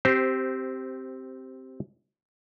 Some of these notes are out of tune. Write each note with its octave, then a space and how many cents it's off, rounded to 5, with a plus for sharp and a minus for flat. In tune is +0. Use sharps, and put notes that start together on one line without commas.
C4 +0 G4 -10 C5 -15